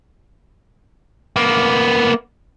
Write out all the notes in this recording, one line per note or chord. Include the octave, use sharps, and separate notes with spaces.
A#3 B3